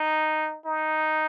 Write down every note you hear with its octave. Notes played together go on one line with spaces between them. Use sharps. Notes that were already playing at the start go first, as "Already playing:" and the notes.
Already playing: D#4
D#4